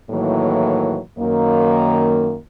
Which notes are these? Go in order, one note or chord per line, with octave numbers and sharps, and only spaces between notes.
A2 D#3 E3 F#3 A#3
F#2 D#3 A#3